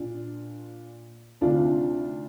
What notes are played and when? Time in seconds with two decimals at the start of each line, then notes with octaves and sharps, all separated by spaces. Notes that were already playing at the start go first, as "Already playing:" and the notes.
Already playing: A#2 D4 F4
1.41 D2 C3 D#3 D4 F4